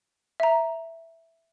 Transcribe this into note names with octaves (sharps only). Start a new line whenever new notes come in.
E5 A#5